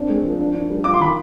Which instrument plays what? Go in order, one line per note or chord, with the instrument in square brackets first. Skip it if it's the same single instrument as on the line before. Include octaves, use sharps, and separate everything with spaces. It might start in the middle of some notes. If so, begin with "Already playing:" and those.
Already playing: [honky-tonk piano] C4 D4
G#3
F3
D4
D4
G3
[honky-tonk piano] F4 [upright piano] D6
[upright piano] C6
[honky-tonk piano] D#3 [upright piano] B5